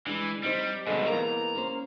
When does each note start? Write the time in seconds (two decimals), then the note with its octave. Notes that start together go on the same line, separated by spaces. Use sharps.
0.07 E3 G#3 D4
0.43 G3 C4 D#4 C5
0.87 G2 B2 D3 G#3
1.07 E2 A#3 A#5
1.55 A#3 C#4 C5